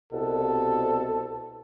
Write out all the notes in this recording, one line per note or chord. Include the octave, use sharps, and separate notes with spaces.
C2 B2 A4